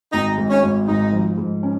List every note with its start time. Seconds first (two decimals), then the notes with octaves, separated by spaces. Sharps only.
0.13 G#1 D#4
0.38 G#2
0.50 C#4
0.63 G#1
0.87 G#2 D#4
1.12 F3
1.38 G#2
1.63 C#4